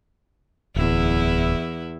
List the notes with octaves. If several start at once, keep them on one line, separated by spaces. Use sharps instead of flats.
D1 E2 E3 E4